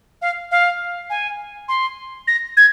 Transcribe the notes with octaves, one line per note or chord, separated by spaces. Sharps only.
F5
F5
G#5
C6
A#6
G#6